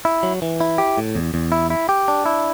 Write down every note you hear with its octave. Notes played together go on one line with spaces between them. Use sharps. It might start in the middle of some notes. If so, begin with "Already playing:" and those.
E4
F#3
E3
E4
G4
A2
E2
E2
E4
E4
G4
D4
E4